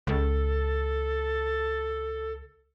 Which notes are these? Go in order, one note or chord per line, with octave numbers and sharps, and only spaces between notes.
C#2 A4